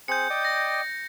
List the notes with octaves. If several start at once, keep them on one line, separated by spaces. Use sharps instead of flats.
C4 G#4 F#6 G6 C#7
D5 D#5 G5
A#6